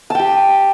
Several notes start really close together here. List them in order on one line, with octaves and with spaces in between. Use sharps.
A5 G5 G4